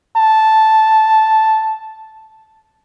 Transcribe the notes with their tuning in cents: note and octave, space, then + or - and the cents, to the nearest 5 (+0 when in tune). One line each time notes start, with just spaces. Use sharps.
A5 -5